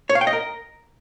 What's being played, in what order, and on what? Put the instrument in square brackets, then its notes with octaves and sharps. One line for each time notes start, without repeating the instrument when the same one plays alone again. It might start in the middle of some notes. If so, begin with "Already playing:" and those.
[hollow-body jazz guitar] C#5
F5
G5
D#5
A#4